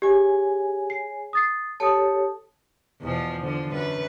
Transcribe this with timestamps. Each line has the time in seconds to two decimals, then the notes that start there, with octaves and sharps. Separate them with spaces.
0.02 G4 G#4 C#5 G#5
0.90 C7
1.33 D#6 A6 C7
1.80 G4 A4 C#5 A5 D#6
3.01 E2 B2 F3
3.41 D3 F3
3.70 F#2 B4